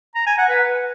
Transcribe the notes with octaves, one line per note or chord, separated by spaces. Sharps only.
A#5
G#5
F#5
B4